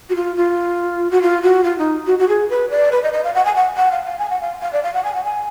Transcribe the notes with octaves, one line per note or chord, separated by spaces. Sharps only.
F#4
F4
F4
F#4
F4
F#4
F4
D#4
F#4
F#4
G#4
B4
D5
B4
D#5
D#5
F5
F#5
G#5
F#5
F#5
F5
F5
G#5
F#5
F5
F5
D5
F5
F#5
G#5
F#5
G#5